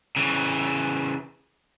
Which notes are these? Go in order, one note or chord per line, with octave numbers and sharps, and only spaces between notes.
C#3 E3